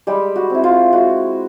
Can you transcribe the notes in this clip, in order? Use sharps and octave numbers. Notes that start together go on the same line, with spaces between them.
G3 G#3 G4
F#4
C4 E4
F4
G#3 F#4